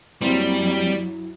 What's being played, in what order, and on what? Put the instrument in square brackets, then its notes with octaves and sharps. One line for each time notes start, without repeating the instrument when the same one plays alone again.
[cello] F#2 F#3 [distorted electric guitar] G3 [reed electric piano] A#3 C4 [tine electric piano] E4